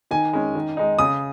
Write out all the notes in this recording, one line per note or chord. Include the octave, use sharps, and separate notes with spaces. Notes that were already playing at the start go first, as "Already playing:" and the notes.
D#3 G#5
G#3 C#4
D#3
G#3 D#4
C#3 D#6